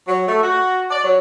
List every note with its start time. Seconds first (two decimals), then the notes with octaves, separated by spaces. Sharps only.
0.06 F#3
0.26 A3
0.42 F#4
0.90 D5
1.03 F#3